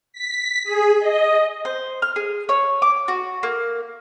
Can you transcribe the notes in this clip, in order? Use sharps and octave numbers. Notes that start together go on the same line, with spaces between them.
B6
G#4
D#5
C5
F6
G#4
C#5
D6
F#4
A#3